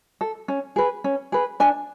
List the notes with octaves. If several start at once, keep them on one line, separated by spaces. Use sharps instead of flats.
A4
C#4
G#4 B4
C#4
G#4 B4
D4 G#5